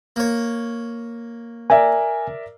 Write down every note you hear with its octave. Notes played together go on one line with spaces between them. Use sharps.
A#3 C#5
A#4 D5 E5 G#5